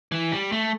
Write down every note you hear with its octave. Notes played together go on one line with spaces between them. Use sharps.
E3
G3
A3